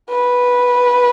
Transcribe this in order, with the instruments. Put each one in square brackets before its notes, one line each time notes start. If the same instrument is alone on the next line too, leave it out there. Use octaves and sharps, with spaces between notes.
[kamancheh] B4